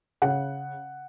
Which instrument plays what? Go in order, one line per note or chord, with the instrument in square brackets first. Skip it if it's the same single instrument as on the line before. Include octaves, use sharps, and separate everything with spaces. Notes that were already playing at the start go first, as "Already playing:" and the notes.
[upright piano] C#3 F#5